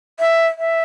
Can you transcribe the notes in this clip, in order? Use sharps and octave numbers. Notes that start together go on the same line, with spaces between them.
E5
E5